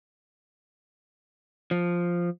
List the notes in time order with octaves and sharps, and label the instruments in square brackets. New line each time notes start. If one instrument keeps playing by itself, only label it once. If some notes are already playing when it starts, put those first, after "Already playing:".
[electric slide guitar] F3